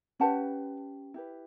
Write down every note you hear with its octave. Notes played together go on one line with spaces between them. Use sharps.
C#4 G4 B4 F#5 A5
E4 G4 B4